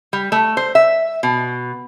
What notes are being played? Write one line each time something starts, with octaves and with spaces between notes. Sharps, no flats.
G3
A3
C5
E5
B2